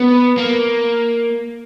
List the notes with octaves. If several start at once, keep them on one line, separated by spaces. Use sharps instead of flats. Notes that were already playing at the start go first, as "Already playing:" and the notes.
Already playing: B3
A#3